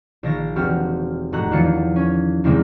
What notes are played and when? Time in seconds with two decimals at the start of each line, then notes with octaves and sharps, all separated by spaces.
0.23 A#1 D#3 A#6
0.56 E1 C4 F#4 G4 F6
1.32 F1 A2 F#4 A#5 F#6
1.51 E2 D#3 F3 F#3 D4 C#7
1.96 C#4
2.44 E2 C3 D#3 E3 G#3 C4